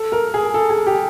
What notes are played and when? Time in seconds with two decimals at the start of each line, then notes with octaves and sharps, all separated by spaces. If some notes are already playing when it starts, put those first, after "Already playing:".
Already playing: A4
0.12 A#4
0.34 G#4
0.54 A4
0.70 G#4
0.87 G4